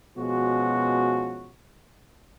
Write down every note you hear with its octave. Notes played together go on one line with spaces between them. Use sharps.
B2 F3 G#3 C#4 F#4